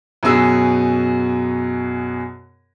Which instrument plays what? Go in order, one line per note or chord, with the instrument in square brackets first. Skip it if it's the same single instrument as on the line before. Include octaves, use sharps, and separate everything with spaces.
[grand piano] F#2 B2 G#4 E6